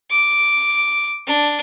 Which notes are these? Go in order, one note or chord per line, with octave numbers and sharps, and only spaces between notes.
D6
D4